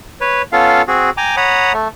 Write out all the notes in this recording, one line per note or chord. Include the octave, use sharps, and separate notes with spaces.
B4 C#5
B3 C#4 F4 A4 F5
C4 F#4 G#4
G5 G#5 A#5 D6
C#5 F#5 A#5 B5 D#6
A3